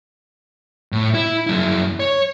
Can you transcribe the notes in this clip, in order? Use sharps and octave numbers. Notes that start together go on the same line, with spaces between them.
A2
E4
F#2 E4
C#5